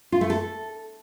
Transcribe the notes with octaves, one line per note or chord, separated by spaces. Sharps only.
F4
A3
A4